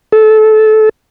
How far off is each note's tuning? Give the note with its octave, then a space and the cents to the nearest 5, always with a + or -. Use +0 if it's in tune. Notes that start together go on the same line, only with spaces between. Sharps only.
A4 -20